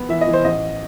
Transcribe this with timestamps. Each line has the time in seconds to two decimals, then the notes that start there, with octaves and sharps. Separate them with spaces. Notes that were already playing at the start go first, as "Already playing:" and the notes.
Already playing: B3
0.09 E3 E5
0.21 D#5
0.27 E3
0.33 C5
0.44 A1 D#5